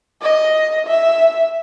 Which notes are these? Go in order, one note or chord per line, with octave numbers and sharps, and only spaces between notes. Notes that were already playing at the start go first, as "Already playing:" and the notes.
D#5
E5